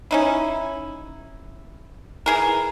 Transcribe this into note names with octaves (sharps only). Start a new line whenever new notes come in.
C#4 D#4 E4
E3 G#4 A#4